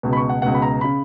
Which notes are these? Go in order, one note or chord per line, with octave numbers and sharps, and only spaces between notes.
C#2 B2
B5
C#6
F#5
C#2 B2 F#5
B5
A#5
C#3 B5